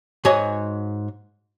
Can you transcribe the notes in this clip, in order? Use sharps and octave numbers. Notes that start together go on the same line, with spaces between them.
G#2 G#3 F#4 C#5 D#5 G#5